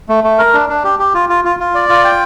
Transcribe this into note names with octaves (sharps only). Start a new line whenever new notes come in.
A3
A3
A#4
D4
D4
G4
G4
F4
F4
F4
F4
D5
F4
G5